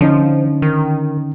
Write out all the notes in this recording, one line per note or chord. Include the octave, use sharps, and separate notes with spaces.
D3 F3 C#4 D#4
D#3